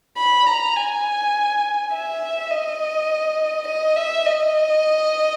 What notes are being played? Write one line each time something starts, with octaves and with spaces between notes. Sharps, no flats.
B5
A#5
G#5
E5
D#5
D#5
E5
D#5